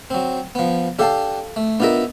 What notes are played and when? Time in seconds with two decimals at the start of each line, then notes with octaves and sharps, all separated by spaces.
0.10 F#3 C4
0.55 F3 B3
0.99 D4 G4 A4 F5 A5
1.56 A3
1.80 B3 D4 D#4 F4 A#4 E5